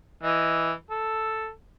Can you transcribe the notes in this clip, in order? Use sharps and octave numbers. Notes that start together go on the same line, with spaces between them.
E3 D#5
A4